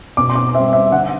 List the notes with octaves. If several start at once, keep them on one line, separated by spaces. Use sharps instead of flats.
B2 D6
C6
D6
G3 C4 E5
E5
D3 F#5